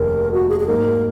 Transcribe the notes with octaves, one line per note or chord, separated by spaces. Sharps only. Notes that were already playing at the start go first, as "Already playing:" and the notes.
Already playing: F1 D#2 C#3 A#4
F#4
G#4
G#4
G#2 F#3 A#3 D#4 A#4